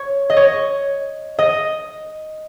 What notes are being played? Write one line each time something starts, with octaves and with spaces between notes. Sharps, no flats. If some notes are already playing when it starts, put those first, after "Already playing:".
Already playing: C#5
D#5
C#5
D#5